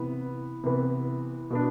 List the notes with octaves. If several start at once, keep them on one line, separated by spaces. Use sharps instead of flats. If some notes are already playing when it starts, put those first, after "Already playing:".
Already playing: C3 E3 B3
C3 E3 B3
B2 B3 D4